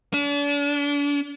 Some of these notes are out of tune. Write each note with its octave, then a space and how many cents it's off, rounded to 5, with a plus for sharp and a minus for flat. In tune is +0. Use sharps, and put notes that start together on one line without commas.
D4 -40